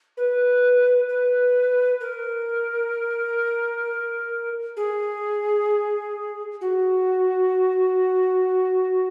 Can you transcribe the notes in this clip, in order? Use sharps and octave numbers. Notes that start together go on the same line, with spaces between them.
B4
B4
A#4
G#4
F#4